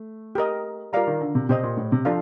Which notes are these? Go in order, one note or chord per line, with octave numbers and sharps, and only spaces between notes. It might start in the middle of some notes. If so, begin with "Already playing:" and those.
Already playing: A3
G4 A#4 D#5
G3 F4 A#4 D5 F5 A#5
D#3
D3
C3
C3 G4 C5 D#5
A#2
A2
C3
F3 D4 A4 D5 F5